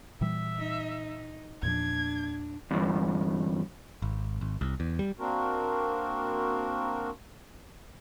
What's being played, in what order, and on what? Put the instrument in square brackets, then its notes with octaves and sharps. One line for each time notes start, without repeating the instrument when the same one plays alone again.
[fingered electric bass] A#2 E3 G3 [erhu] E5
[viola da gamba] D#4
[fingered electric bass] E2 A#2 F3 [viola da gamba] D4 [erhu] G#6
[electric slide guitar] E2 G2
[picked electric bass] G#1
G#1
C2
E2
G3
[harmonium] A#3 C4 D4 F#4 A#4